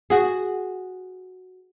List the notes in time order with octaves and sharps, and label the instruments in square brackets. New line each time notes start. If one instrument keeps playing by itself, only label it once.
[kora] F#4 G#4